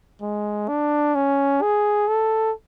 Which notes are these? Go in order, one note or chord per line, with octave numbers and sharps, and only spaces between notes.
G#3
D4
C#4
G#4
A4